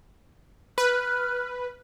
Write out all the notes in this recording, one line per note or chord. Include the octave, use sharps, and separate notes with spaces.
B4 F6 F#6